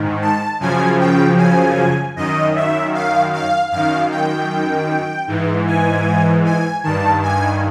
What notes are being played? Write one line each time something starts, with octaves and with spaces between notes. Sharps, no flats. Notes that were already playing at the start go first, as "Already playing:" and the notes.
Already playing: G#2 D#3
A5
F#2 C#3 F3 G#5
G5
G#5
F#2 D#3 D#5
E5
F5
F5
F#2 D#3 F5
G5
G#2 E3
G#5
G#5
G2 D#3 A5
G#5